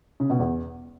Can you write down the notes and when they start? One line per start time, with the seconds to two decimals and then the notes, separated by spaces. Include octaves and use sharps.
0.20 C#3
0.30 B2
0.39 E2